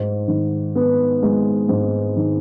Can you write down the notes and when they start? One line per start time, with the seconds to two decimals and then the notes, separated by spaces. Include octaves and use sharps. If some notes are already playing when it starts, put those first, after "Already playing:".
Already playing: G#2
0.28 D#3
0.75 B3
1.23 G#3
1.69 G#2
2.16 D#3